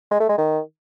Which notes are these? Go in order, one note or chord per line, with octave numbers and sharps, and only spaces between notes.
G#3
A3
G#3
D#3